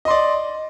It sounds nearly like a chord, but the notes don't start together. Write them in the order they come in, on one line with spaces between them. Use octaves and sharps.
D#5 C6 D5